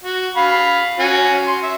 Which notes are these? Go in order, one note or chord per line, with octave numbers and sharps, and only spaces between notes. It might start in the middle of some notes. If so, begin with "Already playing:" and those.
F#4
F5 B5
C#4 F#4
C6
E5